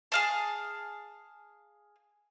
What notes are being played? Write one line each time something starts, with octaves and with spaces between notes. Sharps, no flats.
G#4 F5 A5